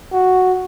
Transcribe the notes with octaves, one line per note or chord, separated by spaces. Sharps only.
F#4